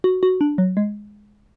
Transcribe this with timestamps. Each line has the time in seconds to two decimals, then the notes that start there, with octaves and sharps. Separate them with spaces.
0.04 F#4
0.23 F#4
0.41 D4
0.58 F#3
0.77 G#3